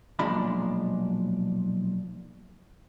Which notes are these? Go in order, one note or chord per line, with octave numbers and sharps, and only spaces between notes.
B1 A#2 F3 G#3 D4 B5